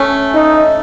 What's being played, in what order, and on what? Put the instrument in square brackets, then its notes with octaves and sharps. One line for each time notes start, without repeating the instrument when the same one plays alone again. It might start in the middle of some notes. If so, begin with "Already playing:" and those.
Already playing: [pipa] A3 C#4
[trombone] D#4